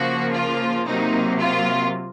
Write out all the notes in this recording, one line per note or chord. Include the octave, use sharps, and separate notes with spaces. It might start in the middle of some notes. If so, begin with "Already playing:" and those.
Already playing: C#3 F3 A#3 F#4
F4
C3 F#3 A#3 D#4
F4